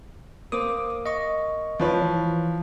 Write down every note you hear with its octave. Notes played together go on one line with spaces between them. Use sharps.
A#3 C5 D6 D#6
D#5 C#6
F3 F4 B4 C#5
E3